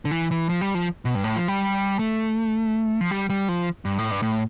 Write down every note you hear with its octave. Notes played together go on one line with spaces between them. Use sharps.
D3
E3
E3
F3
G3
F3
B2
G2
A2
F3
G3
A3
F3
G3
G3
F3
G2
A2
G2
A2